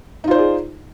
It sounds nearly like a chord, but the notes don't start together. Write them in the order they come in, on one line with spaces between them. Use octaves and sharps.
D#4 F4 C5 D5 G#4